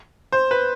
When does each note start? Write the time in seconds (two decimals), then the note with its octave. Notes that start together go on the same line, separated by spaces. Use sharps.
0.32 C5
0.51 B4